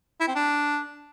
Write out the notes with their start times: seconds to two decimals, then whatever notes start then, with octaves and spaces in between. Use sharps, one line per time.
0.20 E4
0.28 C4
0.35 D4